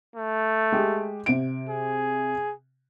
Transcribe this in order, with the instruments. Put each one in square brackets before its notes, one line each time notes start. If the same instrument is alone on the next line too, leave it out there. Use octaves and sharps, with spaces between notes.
[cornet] A3
[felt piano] G#3 G4
C3 D7
[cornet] G#4